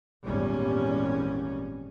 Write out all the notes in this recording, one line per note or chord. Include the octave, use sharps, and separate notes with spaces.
G#1 E2 A#2 G3 C#4